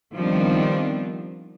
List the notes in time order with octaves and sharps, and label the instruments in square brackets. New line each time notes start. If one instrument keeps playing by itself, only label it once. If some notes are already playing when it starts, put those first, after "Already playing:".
[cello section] D#3 F3 G3 B3 C4 D4